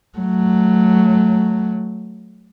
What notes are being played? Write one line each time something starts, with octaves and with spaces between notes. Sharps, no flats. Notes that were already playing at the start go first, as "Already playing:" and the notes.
F#3 A3